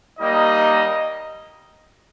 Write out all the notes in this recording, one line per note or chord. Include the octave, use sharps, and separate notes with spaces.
G3 A#3 D#4 D#5